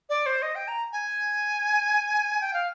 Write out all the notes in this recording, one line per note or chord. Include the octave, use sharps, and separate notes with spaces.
D5
C5
D#5
G5
A#5
G#5
G5
F5